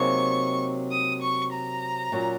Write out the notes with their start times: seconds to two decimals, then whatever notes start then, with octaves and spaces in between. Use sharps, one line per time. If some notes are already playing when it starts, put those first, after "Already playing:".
Already playing: C3 F#3 A#3 D#4 G#4 C#6
0.92 D#6
1.22 C#6
1.52 A#5
2.12 A#2 F#3 C#4 F#4